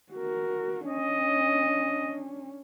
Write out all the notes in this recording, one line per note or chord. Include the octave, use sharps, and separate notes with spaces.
F#4 A#4
C#4 D4 D#5